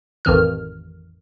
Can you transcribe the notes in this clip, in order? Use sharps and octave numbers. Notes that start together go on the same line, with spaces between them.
A1 F2 D#3 F6